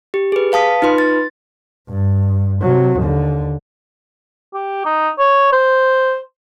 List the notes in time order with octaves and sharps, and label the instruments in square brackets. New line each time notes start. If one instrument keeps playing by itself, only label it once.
[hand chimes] G4
G#4 B4
B4 F5 A5 D#6 B6
D#4 F4 B4 C6
A6
[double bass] G2
C3 F#3
D#2 D3
[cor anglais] G4
D#4
C#5
C5